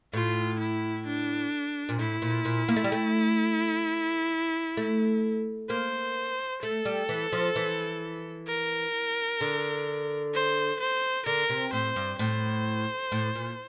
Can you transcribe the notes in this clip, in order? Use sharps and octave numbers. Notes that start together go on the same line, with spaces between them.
A2 F4
E4
D4
A#2
A2 E4
A#2
A#2
A#3
A3
G3
A3
A3
A#3 C5
A3 A4
G3
E3
F3
E3
A#4
D3
C5
C5
D3 A#4
C3
A2 C5
G2
A2 C5
A2
A#2